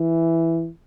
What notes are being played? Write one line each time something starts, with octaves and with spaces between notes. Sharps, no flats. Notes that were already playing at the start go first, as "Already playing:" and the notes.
Already playing: E3